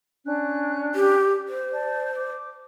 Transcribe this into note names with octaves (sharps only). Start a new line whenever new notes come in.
C#4 D4 F#6
G4
C5
D5 A5
D6